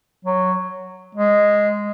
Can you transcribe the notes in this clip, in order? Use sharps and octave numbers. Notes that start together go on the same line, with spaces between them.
F#3
G#3